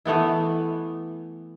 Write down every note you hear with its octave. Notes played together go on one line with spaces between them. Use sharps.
E3 A3 B3 E4